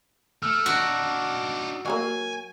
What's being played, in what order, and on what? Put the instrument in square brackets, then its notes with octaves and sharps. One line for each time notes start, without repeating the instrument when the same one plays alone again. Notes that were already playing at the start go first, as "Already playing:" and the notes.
[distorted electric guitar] A3 [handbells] E6 F6
[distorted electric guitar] D4 D#4 [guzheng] F#4
[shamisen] F#3 G3 A#3 [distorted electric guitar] G#5